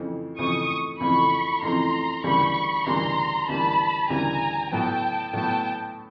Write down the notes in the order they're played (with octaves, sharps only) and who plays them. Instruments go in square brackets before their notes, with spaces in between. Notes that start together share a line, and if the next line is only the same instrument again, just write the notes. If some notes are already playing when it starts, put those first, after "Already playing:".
Already playing: [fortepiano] F2 C#3 E3 A3 C4
[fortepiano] F2 C#3 E3 A3 C4 [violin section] C#6 D#6
[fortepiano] F2 C#3 E3 A3 C4 [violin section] B5 C#6
[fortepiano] F2 C#3 E3 A3 C4 [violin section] A#5 C6
[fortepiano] D2 C#3 E3 G3 A#3 [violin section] B5 C#6
[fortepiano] D2 C#3 E3 G3 A#3 [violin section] A#5 C6
[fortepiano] D2 C#3 E3 G3 A#3 [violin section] A5 B5
[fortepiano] D2 C#3 E3 G3 A#3 [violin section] G#5 A#5
[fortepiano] A2 F#3 B3 [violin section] G5 A5
[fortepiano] A2 F#3 B3 [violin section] G5 A5